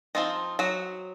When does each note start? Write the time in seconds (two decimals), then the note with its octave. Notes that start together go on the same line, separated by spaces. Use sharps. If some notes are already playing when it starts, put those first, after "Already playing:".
0.15 F3 C4 D#4 F4
0.59 F#3 F#4